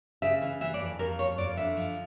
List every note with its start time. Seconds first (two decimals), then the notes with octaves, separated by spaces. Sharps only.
0.22 C#3 E5
0.42 E3
0.61 E3 E5
0.74 D5
0.81 F2
0.99 F2 A#4
1.19 F3 C#5
1.38 F2 D5
1.57 D3 E5
1.77 F3